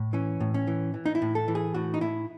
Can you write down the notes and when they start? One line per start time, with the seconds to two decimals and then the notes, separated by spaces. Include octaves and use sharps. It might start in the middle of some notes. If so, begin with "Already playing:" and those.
Already playing: A2
0.13 E3 C#4
0.40 A2
0.54 C#4
0.67 E3
0.94 E3
1.06 D#4
1.15 E4
1.22 A2
1.35 A4
1.48 E3
1.55 G#4
1.74 A2 F#4
1.94 D#4
2.01 A2 E4